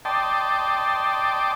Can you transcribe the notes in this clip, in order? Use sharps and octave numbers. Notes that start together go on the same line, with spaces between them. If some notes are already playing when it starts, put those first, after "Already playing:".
D5 D#5 G5 A5 C6